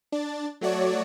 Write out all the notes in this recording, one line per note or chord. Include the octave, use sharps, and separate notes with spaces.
D4 A6
F#3 A3 F#4 C#5 D5